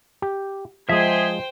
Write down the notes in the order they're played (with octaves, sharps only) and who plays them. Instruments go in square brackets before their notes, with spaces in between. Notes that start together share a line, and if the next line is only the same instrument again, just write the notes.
[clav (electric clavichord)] G4
[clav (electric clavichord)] F3 G#3 [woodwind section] G#4 [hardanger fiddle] C5 G5 [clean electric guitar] E5